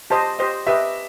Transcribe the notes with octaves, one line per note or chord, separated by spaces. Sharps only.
G4 C5 D#5 A5
G4 C5 D#5
G4 B4 D#5 E5